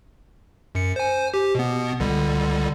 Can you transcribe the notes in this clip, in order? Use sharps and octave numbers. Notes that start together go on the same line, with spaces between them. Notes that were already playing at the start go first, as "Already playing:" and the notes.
F#2 C#7
C5 G#5
G4
B2 B3
C#2 D3 G3